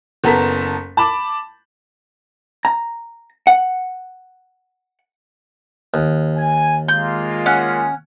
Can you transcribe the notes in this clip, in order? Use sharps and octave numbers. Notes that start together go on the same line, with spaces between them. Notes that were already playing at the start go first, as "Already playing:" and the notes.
F#1 B3 A4 A#5 B6
A5 B5 D6
A#5
F#5
D#2
G#5
G#3 A#3 F4 G6
C#4 F#5